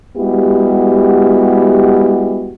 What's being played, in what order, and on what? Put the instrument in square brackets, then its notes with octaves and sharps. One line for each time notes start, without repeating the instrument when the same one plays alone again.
[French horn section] G3 G#3 B3 E4 F#4 G4